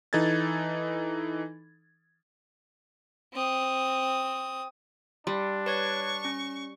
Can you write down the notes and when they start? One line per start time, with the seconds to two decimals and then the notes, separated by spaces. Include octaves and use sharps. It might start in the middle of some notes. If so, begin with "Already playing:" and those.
0.13 E3 D#4 A4 G#6 A6
3.33 C4 D#6
5.27 G3 D4 C6
5.66 B4 C#5 C#6 G#6
6.25 C#4